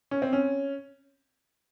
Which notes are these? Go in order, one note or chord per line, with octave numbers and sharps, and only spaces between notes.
C#4
C4
C#4